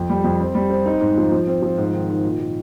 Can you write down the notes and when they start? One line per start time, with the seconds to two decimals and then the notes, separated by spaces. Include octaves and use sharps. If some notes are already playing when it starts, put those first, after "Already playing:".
Already playing: F2
0.10 G3
0.24 F2
0.40 C4
0.55 G3
0.70 C4
0.86 D#4
1.01 G#2
1.17 F3
1.31 F3
1.47 C4
1.62 F3
1.78 G#2
1.93 D#3
2.10 D#3
2.24 A#2
2.40 A#2